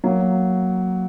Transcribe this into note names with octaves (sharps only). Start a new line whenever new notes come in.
F#3 A#3